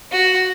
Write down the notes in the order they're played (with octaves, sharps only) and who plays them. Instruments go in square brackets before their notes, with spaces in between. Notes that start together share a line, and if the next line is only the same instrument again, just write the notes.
[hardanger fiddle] F#4